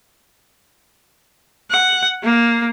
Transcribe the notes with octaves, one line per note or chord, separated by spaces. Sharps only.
F#5
A#3